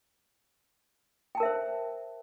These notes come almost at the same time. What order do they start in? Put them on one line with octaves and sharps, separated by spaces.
G5 A5 A#4 E5 C5